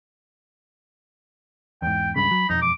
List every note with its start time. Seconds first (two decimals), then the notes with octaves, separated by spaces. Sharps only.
1.82 E2 G#2 G5
2.16 C#2 G2 C#3 B5
2.31 F#3
2.50 E1 C2 F2 D#4
2.62 D6